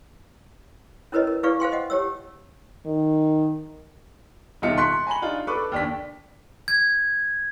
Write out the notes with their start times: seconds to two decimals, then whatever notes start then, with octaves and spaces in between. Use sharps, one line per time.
1.12 C#4 E4 A#4 B4 C#5 D#5
1.27 A#4
1.43 E4 G#4 B4 D5 F5 C#6
1.60 C5 F5 G5 C6
1.72 D#5 F#5
1.90 G4 C#5 E6
2.86 D#3
4.62 D#1 B2 D#4 F4 E5 C#7
4.78 C6 C#6 F#6 B6 C#7
5.07 G#5 A#5 B5 F#7
5.22 D4 D#4 F4
5.47 A4 B4 C#6 D6
5.72 D#2 D4 B6
6.68 G#6